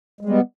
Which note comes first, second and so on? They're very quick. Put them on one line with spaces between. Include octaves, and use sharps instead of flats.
G#3 G3 B3